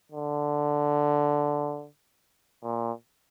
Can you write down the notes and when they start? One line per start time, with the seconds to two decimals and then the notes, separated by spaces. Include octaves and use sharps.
0.12 D3
2.63 A#2